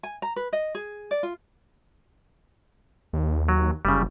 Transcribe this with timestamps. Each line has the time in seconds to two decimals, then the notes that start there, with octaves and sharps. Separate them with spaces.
0.03 G#5
0.22 A#5
0.36 B4
0.53 D#5
0.75 G#4
1.11 D5
1.23 F4
3.13 D#2
3.49 F#3
3.85 F#1 C#3 G3